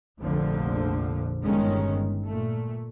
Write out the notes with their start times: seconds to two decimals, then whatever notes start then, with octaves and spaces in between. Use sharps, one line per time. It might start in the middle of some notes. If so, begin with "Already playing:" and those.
0.21 F1 A#1 F2 A#2 D3 F3
1.41 G1 G2 D#3 G#3 C#4
2.25 A#2 A3